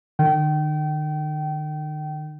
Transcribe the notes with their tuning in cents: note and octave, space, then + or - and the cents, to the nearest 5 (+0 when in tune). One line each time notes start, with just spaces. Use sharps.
D#3 -45 G5 -30